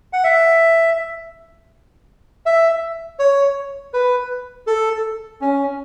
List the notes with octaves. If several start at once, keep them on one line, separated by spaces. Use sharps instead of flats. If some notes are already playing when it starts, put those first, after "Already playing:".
F#5
E5
E5
C#5
B4
A4
C#4